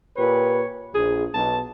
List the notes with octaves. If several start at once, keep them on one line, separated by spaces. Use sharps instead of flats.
A#2 G4 B4 C#5
A#1 G#4
B1 B2 A5